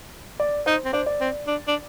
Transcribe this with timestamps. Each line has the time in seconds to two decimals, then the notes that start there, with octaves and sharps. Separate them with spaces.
0.40 D5
0.66 D#4 C5
0.85 C4
0.93 D4 C5
1.06 D5
1.20 C4
1.47 D4
1.67 D4